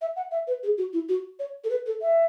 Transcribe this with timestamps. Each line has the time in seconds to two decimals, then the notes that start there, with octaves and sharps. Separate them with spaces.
0.01 E5
0.16 F#5
0.31 E5
0.47 B4
0.63 G#4
0.78 F#4
0.93 E4
1.09 F#4
1.39 C#5
1.64 A4
1.70 B4
1.86 A4
2.02 E5